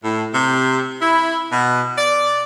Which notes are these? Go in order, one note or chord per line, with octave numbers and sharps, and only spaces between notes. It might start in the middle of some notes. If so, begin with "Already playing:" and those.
A2
C3
E4
B2
D5